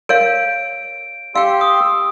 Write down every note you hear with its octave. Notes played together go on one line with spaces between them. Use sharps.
A#4 C#5 F5 D7
G4 F5 G5 C6 E6
D#6